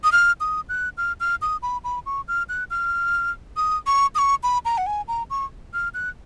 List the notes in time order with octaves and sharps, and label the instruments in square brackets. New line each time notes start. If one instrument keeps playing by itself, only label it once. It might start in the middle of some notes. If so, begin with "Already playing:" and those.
[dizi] D#6
F6
D#6
F#6
F6
F6
D#6
B5
B5
C#6
F6
F#6
F6
D#6
C#6
D#6
C#6
B5
A#5
F#5
G#5
A#5
C#6
F6
F#6